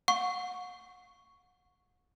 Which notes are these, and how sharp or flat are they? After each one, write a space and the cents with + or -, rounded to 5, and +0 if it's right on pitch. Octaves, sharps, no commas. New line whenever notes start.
F#5 -35 C#6 +0